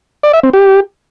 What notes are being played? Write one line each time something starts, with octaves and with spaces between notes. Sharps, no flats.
D5
E5
C4
G4